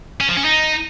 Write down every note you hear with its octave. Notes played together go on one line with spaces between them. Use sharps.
C#4
F3
C#4
D#4